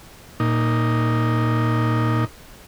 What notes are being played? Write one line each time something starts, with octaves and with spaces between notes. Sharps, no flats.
A#2 D#4